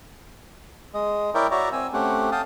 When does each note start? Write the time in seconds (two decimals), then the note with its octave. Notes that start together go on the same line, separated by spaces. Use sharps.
0.94 G#3 D#5
1.35 E4 A#4 C#5 D5 E5 G5
1.51 F#4 C#5 D5 E5 A#5
1.73 C4 G#5 E6
1.93 A3 C4 C#4 G4 F#5
2.32 F5 G5 A5 D#6